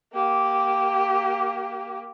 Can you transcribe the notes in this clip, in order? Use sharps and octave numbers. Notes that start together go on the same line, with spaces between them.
A#3 G4